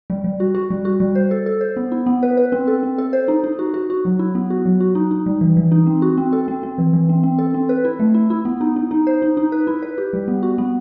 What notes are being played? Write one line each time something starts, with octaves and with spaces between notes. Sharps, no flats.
G3
G3
F#4
F#4
G3
F#4
G3
C5
A4
A4
C5
B3
E4
B3
B4
B4
C4
A4
C4
A4
C5
D#4
D#4
F#4
F#4
F#4
F#3
E4
B3
F#4
F#3
F#4
D#4
D#4
G3
E3
E3
D#4
C4
F#4
C4
A4
C4
C4
E3
E3
C4
C4
A4
C4
B4
E4
A3
E4
E4
B3
D#4
D#4
D#4
C5
D#4
D#4
B4
E4
B4
G4
G3
B3
F#4
B3